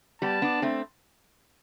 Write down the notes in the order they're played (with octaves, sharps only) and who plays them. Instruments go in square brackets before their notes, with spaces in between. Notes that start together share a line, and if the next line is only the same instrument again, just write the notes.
[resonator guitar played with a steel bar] G3 B3 [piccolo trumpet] A5
[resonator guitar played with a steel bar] B3 D4
A3 C4